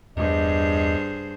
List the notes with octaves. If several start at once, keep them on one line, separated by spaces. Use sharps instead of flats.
E2 G2 G#4 C5 D#5